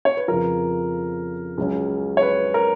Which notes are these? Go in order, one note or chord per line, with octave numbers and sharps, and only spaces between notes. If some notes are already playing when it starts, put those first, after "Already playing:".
C#5
B4
F2 C#3 F3 A#4
C#2 C#3 F#3 C#4
C#5
B4
A#4